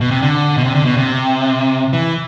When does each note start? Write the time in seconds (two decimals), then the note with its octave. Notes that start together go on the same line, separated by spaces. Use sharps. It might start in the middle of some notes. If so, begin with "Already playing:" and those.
0.01 B2
0.11 C3
0.22 D3
0.57 B2
0.64 C3
0.75 D3
0.85 B2
0.97 C3
1.93 E3